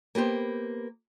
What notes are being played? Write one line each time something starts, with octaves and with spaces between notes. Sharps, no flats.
A#3 B3 G4 C5